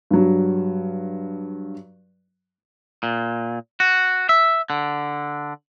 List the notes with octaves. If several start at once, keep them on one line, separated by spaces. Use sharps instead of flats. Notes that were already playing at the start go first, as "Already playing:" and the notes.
G2 F#3
A#2
F#4
E5
D3